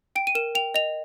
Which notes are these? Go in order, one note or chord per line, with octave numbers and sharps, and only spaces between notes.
G5 D7
D#7
A#4 E7
G5 F7
D#5 F7